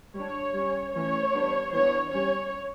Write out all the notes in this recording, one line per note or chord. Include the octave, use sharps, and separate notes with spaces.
G3 D4 C#5
G3 C#4
E3 A3 C#4 C#5
G3 B3 D4
E3 B3 D4 C#5
G3 C#4 C#5